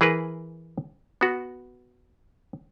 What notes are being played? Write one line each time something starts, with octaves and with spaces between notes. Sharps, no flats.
E3 G#4 A#4 B4
B3 F#4